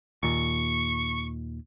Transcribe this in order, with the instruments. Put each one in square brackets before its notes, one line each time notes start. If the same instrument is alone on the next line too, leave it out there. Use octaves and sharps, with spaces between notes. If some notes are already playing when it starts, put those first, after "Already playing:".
[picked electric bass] D#2 A#2 [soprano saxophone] C#6